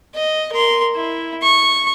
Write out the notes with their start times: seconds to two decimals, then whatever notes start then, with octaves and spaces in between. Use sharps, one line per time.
0.15 D#5
0.52 A#4 C6
0.95 E4
1.42 C#6